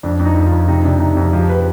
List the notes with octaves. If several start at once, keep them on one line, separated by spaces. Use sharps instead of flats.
F2 D4
F2
D#4
F2
F4
F2
C3 D#4
C3 D4
C3 D#4
F2
F3 G4
B4